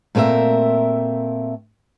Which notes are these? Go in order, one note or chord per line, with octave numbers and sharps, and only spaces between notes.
A#2 A3 C4 A#4 E5